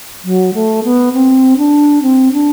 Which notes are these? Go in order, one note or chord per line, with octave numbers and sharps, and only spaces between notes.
F#3
A3
B3
C4
D4
C4
D4